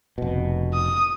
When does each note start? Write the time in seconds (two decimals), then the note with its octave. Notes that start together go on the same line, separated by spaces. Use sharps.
0.18 F1 B2
0.74 D#6